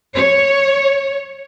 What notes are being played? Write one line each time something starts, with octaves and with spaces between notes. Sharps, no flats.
C#5